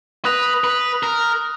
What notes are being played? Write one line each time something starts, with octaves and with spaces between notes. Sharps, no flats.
B4 D#6 F#6 A#6 F7
B4
A#4